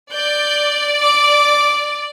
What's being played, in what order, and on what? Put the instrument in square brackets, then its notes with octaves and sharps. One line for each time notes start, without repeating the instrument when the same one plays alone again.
[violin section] D5 [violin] G6
[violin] D6